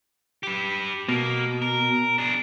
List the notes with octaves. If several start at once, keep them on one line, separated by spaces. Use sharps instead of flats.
G4 B4
B2 A#3
A#4
D4 G#4